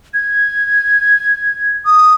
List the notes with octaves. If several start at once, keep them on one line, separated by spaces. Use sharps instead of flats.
G#6
D#6